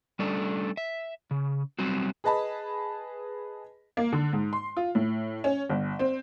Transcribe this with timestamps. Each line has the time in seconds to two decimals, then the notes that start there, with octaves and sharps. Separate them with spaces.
0.19 G3 A3 C#4 D4 A4
0.77 E5
1.31 C#3
1.79 F#3 G3 C4 F#4
2.24 G#4 B4 D#5 A5 B5
3.97 A#3
4.12 D3
4.33 G#2
4.53 C6
4.77 F4
4.95 A2
5.44 C#4
5.69 G1
5.99 C4